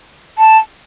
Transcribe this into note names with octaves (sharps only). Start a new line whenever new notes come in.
A5